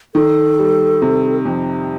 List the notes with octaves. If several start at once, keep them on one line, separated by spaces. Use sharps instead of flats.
D#3 A4
G3
C3
F2